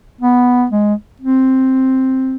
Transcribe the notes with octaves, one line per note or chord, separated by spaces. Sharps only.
B3
G#3
C4